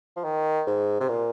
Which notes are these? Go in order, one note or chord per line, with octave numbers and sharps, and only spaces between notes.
F3
D#3
G#2
C3
A#2